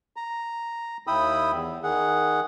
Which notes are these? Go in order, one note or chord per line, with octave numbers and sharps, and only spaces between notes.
A#5
D#2 E4 G5 B5 D#6 E6
E2
D#3 G#4 F#5